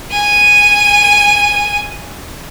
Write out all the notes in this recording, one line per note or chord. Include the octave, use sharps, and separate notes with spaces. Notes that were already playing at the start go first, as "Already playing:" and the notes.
G#5 D#7